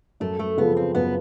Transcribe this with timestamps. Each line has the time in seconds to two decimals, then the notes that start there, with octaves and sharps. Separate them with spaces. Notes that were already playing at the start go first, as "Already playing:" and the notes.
0.20 F#2 A3
0.39 A3
0.57 C#3 F3 B3
0.77 C4
0.95 F#2 B3